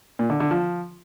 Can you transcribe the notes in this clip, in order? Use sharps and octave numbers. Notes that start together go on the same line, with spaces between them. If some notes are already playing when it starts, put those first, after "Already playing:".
A#2
D3
D3
F3